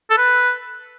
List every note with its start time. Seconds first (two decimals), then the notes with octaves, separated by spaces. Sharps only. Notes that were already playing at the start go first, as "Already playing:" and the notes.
0.10 A4
0.18 B4